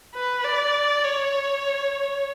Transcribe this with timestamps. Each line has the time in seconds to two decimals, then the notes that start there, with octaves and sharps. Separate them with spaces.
0.15 B4
0.45 D5
1.04 C#5